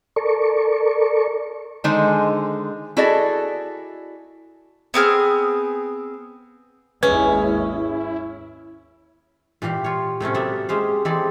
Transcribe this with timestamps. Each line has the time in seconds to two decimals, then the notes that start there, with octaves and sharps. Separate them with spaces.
0.16 A4 A#4 D5 C#6
1.84 D3 D#3 G#3 D#4 G#4 C5
2.97 E4 F#4 G#4 A4 D5 D#5
4.94 B3 C4 G#4 F6
7.03 G#1 D#2 G#3 C#4 E4 B4
9.62 A#2 E3 G4 F5
9.84 F4 C#5
10.20 A2 C3 A3 C#4
10.34 F#3 A#3 B3 A4 D5 E5
10.69 G#3 C#4 G4 C5 F5
11.05 E3 G#3 C4 G4 A4 D5